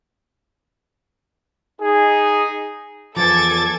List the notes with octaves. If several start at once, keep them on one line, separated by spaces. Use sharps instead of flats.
D#4 G#4
E2 G2 F3 A4 G#5 D6 G#6 A6